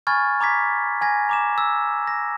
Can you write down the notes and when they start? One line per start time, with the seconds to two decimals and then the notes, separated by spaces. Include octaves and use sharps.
0.07 G#5 B5 C#6 F6 G#6 A6
0.41 A#5 D6 G#6 B6
1.01 G#5 G#6 A#6
1.29 A#5 D6 E7
1.58 E6
2.07 A#6